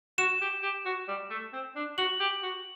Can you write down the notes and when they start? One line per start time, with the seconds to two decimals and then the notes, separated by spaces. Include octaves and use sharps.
0.18 F#4 E7
0.41 G4
0.63 G4
0.86 F#4
1.08 G3
1.30 A3
1.53 C4
1.76 D4
1.98 F#4 F#7
2.20 G4
2.43 F#4